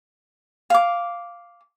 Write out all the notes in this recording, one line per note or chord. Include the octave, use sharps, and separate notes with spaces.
F5 D6